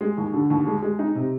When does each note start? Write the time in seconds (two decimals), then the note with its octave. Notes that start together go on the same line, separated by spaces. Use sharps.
0.01 G#3
0.18 D#2
0.34 D3
0.50 D#2
0.67 G#3
0.82 G#3
0.99 D#4
1.15 C3